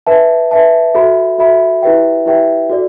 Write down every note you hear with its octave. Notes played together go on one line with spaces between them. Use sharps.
B4 E5 A5
B4 E5 A5
F#4 A4 E5 B5
F#4 A4 E5 B5
E4 G4 B4 E5 G5
E4 G4 B4 E5 G5
F#4 A4 D5